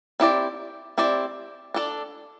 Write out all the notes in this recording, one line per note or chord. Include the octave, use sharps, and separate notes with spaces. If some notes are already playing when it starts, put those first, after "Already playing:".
C4 E4 G4 D5
C4 E4 G4 D5
D4 A4 D5